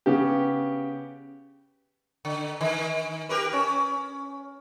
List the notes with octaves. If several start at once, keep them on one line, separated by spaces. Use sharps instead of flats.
C#3 B3 G4
D3
D#3
G4 A#4 B4
C#4